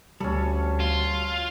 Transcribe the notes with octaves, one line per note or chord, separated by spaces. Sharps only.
D2 G3 C#4 A4
F4